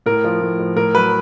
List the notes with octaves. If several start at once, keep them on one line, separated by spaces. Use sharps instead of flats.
A2 A#4
F3
A2
F3
A2 A#4
F#3 B4